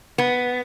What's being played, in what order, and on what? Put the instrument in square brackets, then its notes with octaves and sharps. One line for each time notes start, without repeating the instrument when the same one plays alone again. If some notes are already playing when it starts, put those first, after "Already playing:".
[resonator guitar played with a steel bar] B3